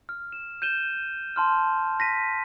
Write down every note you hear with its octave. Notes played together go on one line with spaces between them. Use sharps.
F6
E7
G6 D#7 E7 G7
A5 C6 F6
A#6 B6 D#7